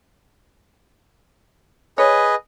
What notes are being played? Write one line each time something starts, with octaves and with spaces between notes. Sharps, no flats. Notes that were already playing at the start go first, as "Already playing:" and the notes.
G#4 B4 C#5 D#5